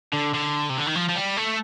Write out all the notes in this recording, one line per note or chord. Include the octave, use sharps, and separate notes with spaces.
D3
D3
C3
D3
D#3
F3
F3
G3
A3